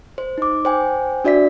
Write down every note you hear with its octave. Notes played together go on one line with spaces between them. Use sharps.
C5
D#4 D6
C5 G5 G#5
D4 F#4 D5 E5 B6